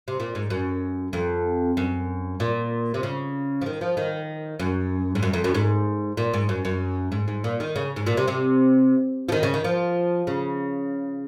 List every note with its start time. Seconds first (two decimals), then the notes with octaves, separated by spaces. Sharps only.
0.08 C3
0.20 A#2
0.35 G#2
0.50 F#2
1.13 F2
1.77 F#2
2.40 A#2
2.94 C3
3.03 C#3
3.62 F3
3.66 D#3
3.81 F3
3.97 D#3
4.60 F#2
5.15 G#2
5.23 F#2
5.33 F2
5.44 F#2
5.55 G#2
6.17 A#2
6.34 G#2
6.49 F#2
6.65 F#2
7.12 G#2
7.28 G#2
7.44 A#2
7.60 D#3
7.76 C#3
7.96 G#2
8.06 A#2
8.17 C3
8.28 C3
9.29 F3
9.32 D#3
9.43 C#3
9.54 D#3
9.64 F3
10.27 C#3